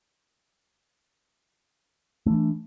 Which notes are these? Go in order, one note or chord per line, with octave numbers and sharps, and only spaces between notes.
E3 A3 D4